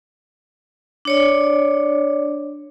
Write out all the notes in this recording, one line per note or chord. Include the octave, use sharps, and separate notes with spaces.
D4 C#5 D5